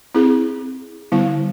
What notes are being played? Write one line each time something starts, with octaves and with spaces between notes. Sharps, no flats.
C4 E4 G#4
D3 G3 B3 E4